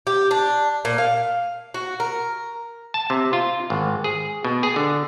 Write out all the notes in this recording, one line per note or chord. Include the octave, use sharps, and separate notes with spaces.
G4
D4
A#2
F5
F#4
A#4
A5
C3
F4
G#1
G#4
B2
G#4
D3